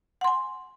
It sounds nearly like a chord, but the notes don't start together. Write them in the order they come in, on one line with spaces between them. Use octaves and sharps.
F#5 C6 G#5